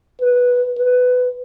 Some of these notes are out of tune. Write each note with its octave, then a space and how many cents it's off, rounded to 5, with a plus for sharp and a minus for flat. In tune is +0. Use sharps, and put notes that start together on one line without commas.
B4 -10
B4 +15